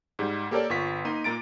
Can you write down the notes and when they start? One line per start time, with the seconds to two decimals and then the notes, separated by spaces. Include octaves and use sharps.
0.19 G#2 G3
0.51 A#3 G4 A4 A#4 C#5 D5
0.70 G1 F4 C#6 B6
1.05 A#3 D#4 C6 D#7
1.24 A#2 A#3 A#5 A6 D7